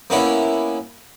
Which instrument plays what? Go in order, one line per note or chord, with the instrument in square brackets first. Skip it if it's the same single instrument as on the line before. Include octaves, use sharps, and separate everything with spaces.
[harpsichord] A#3 B3 C#4 E4 C#5